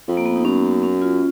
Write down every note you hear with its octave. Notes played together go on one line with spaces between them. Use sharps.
F2
A#3
B3
D#4
F#2 C#4
C#4
F4